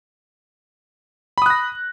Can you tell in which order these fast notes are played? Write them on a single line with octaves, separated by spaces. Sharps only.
B5 D#6 F#6 A#6